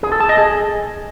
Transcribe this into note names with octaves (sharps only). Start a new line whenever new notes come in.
G#4
A4
A5
D#5
G#4